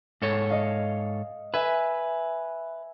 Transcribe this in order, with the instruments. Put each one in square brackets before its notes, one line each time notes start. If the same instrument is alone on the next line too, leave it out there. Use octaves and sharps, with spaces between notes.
[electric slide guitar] G#2 A4 C#5 [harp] C#7
[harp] D#5 F5
[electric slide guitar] B4 [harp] E5 G#5